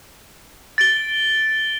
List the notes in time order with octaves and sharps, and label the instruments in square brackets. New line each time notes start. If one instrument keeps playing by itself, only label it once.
[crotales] A6 D7 G7